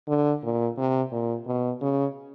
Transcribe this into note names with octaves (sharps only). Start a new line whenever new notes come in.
D3
A#2
C3
A#2
B2
C#3